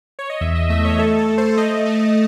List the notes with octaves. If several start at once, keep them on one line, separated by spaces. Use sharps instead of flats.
C#5
D#5
E2 E5
D#5
A3 E5
C#5
A3 A4
A4
A3
C5
A3 D#5
A3